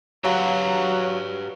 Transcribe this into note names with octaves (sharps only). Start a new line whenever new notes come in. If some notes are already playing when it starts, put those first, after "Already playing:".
F#3 F#4 G4 B4 F5 F#5 A#5